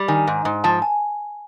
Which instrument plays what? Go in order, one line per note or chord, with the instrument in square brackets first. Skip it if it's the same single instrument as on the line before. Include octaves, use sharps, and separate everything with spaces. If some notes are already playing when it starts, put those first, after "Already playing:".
Already playing: [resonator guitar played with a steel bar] G3
[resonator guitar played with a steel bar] D#3 [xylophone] G#5
[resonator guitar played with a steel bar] G#2
G#2
[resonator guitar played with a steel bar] F3 [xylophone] A5
[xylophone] G#5